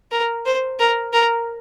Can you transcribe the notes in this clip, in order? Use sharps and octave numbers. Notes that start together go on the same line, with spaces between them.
A#4
C5
A#4
A#4